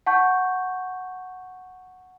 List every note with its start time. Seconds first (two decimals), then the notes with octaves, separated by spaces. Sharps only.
0.06 F#5 A5 C#6 G6